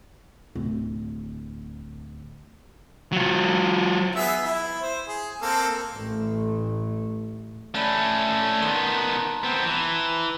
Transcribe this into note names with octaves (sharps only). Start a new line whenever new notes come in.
D1 D3
F#3 F4
B3 G#4 E5
E4
C5
G#4
A#3 C4 A4
A1 A3
A3 C#4 D5 A5 B5
D#3 B3 A5 A#5 C6
B3 C4
E3